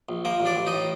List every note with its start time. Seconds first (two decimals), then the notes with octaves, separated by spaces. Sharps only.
0.09 A#1
0.25 F3 A#3 A#4
0.40 A1
0.45 D4 D5
0.56 A1
0.66 D#4 D#5
0.73 A2